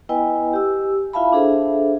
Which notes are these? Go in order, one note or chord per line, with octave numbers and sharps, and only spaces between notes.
B3 E4 B4 D#5 G5 G#5
G4 E6
E4 F4 E5 F5 A5 B5
D4 G#4 A4 C5 E5